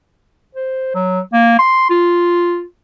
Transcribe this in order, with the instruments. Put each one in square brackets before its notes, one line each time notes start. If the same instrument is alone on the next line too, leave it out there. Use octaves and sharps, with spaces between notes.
[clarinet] C5
F#3
A#3
C6
F4